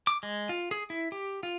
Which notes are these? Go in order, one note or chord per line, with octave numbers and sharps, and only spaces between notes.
D6
G#3
F4
G#4
E4
G4
F4